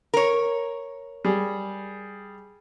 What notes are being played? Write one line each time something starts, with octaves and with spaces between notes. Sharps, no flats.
A#4 C#5
G3 G#4